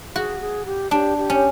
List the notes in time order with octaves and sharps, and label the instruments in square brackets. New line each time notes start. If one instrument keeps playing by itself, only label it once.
[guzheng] F#4 [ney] G#4
[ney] G4
G#4
G4
[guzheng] D4 [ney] G4
[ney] G4
[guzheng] C#4